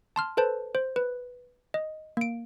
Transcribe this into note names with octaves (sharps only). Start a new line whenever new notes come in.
A5 C6 F6
A4 B4 C5 A5
C5
B4
D#5
A#3 D7